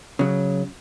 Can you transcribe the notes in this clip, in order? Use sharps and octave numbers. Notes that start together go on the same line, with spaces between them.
C#3 F#3